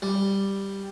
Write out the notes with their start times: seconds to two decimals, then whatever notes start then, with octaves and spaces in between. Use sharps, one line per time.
0.02 G3